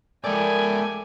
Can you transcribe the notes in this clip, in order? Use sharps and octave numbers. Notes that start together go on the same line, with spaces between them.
G#3 A4 A#4 D5 E5 G5 G#5